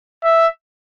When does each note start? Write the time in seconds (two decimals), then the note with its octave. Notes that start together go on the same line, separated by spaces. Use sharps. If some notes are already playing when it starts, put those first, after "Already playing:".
0.24 E5